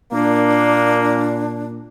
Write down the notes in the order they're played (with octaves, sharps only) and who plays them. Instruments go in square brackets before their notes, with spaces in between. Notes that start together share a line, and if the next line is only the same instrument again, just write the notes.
[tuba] A#2 [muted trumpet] A#3 [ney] D4